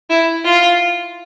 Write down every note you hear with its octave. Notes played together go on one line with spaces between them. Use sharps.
E4
F4